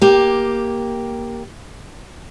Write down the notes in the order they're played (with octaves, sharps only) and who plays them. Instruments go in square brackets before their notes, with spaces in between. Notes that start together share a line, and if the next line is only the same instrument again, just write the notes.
[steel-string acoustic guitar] A#3 G4